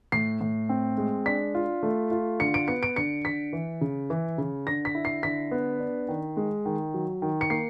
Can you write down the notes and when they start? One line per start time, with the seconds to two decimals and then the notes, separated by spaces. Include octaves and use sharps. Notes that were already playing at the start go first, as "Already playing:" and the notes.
0.12 A2 C7
0.41 A2
0.69 C4
0.98 G#3
1.26 D4 B6
1.55 F4
1.83 A3
2.11 F4
2.39 D3 C#7
2.54 D7
2.68 B3 C#7
2.83 D7
2.96 D3 C#7
3.25 D3 B6
3.53 E3
3.81 C#3
4.10 E3
4.38 C#3
4.67 D3 A#6
4.85 B6
4.95 E4
5.05 C7
5.23 D3 B6
5.51 B3
5.80 D4
6.08 D#3
6.37 G#3
6.65 D#3
6.94 F#3
7.22 D#3
7.41 C#7
7.50 A#3 C7